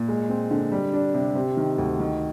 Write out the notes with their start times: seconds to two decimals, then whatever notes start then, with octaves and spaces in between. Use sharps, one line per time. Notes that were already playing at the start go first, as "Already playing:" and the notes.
Already playing: A#2
0.08 G#3
0.29 C4
0.51 D3
0.72 G3
0.94 D4
1.14 C3
1.35 C3
1.57 D#3
1.78 D2
2.00 D#3